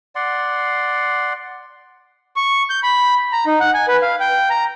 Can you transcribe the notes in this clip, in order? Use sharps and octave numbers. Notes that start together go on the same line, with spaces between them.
D5 F#5 C6
C#6
G6
B5
A#5
D#4
F#5
G#5
B4
F5
G5
A#5